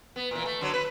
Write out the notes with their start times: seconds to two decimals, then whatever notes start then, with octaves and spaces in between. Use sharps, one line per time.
0.16 B3
0.31 A#2 E3
0.46 A3
0.61 D3 F#3
0.74 B4